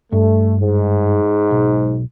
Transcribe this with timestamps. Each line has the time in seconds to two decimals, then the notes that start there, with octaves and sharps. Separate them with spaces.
0.12 G2 A3
0.60 G#2
1.51 B1